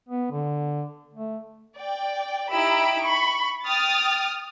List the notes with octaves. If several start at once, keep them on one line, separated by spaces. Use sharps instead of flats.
B3
D3
A3
D5 G5
D#4 E4 G4 B5 E6 D7
B5 C#6
G5 D#6 F6 A6